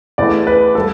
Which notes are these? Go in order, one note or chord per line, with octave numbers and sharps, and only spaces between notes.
E2 E3 A3 D5
B4
G3 A4